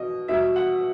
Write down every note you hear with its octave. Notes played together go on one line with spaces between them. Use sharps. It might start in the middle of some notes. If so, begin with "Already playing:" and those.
Already playing: B2 D#5
B2 G3 E5
F#5